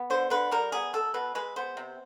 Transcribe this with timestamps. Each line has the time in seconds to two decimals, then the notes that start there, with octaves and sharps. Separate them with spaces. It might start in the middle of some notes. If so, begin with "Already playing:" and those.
Already playing: B3
0.10 D3 C5
0.30 D3 B4
0.51 G3 A#4
0.72 B3 G#4
0.93 B2 A4
1.14 B2 B4
1.35 G#3 B4
1.56 B3 C5
1.77 C3